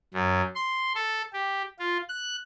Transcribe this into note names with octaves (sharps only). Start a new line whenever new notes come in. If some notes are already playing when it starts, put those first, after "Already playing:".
F#2
C6
A4
G4
F4
F#6